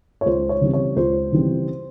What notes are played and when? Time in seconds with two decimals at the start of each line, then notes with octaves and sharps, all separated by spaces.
0.21 C#5
0.26 C#2 C5
0.49 C#5
0.61 C#3 E3 G3 C4
0.74 C#5
0.96 C#2 C5
1.32 C#3 E3 G3 C4